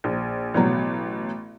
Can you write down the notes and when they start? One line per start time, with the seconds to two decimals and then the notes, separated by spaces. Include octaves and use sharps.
0.04 A#1
0.54 A1 B2 F#3